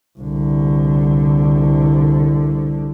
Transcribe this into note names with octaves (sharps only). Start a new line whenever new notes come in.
C2 D3